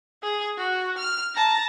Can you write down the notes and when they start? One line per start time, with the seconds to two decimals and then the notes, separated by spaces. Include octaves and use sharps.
0.23 G#4
0.57 F#4
0.98 F6
1.35 A5 A#5